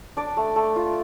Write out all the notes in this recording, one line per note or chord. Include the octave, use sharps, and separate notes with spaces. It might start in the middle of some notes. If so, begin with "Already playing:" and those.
D4 D5
A3
A3
F4